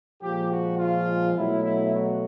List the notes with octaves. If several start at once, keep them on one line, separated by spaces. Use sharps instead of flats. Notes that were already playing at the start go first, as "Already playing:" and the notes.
A#2 F3 G#3 G4
F#4
F4
B2 F#3 A3 E4
E4
F#4